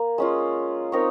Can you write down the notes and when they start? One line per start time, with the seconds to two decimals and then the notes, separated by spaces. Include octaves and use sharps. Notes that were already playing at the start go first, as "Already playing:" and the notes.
Already playing: A#3
0.18 G#3 C#4 F4
0.92 C4 D#4 A#4 C#5